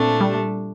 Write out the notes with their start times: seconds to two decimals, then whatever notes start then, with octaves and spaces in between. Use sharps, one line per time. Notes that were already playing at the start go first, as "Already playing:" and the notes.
Already playing: A#2 A3 C4 D4
0.21 G3